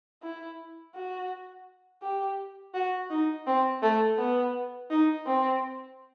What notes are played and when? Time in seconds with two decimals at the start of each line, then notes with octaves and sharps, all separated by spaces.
0.23 E4
0.95 F#4
2.03 G4
2.74 F#4
3.10 D#4
3.47 C4
3.83 A3
4.18 B3
4.90 D#4
5.26 C4